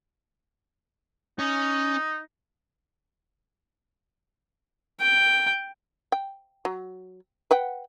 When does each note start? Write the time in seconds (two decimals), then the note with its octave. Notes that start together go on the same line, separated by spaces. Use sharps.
1.39 C#4 D#4
5.01 G5
6.12 G5
6.65 F#3
7.51 B4 F#5 G5